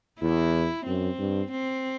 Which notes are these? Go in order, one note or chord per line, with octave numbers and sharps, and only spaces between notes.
E2 E4
F#2 C4
G2
C4